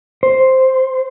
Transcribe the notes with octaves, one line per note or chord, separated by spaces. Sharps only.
C5